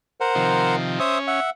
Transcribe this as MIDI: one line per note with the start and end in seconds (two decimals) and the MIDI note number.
0.21 0.76 70
0.21 0.76 72
0.21 0.76 78
0.35 0.99 48
0.35 0.99 51
0.35 0.99 53
1.00 1.40 61
1.00 1.18 72
1.00 1.18 76
1.00 1.18 87
1.27 1.50 76
1.27 1.50 78